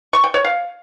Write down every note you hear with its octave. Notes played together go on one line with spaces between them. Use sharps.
C#6
G5
C#5
F5